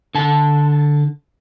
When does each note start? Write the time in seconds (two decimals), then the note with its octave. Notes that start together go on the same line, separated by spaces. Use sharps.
0.15 D3 A5